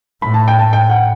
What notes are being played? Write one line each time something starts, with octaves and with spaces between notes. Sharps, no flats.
A2 B5
A5
G5
A5
G5
F#5